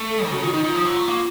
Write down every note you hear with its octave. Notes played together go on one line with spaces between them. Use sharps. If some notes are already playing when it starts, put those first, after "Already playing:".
Already playing: A3
A4
D#3
C#3 F#4
D#3 F4
D#3 D#4
D#3 F4
F3
F#3
A3
A#3